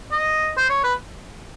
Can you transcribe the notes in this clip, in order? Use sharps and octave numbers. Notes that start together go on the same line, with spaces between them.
D#5
C5
C#5
B4